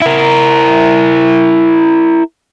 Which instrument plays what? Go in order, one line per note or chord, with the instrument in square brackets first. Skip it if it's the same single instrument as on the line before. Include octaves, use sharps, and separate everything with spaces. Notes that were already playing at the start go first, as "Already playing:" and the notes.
[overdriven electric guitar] E4 A#4